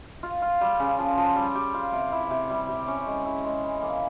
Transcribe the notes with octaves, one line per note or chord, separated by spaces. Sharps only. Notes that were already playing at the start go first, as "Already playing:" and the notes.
F4
F4
G3
C#3
F3
F3
G3
G4
F4
C3
E4
C3
G3
G4
C#4
G#3
E4
G#3
E3
A#3